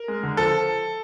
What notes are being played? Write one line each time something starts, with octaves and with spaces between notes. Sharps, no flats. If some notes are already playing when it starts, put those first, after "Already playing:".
Already playing: A#4
G#3
D3
F3 A4